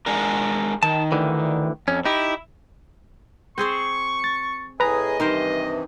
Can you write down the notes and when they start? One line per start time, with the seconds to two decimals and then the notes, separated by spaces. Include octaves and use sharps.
0.06 G#3 D4 A#4
0.83 D#3 A5
1.12 D2 D3 E3
1.88 F2 C#4
2.05 D#4 E4 G4
3.58 C4 G#4 C5 C#6
4.24 A6
4.80 A2 G#4 B4 D#5 A#5
5.20 G2 C3 D#3 E3 A#4 C5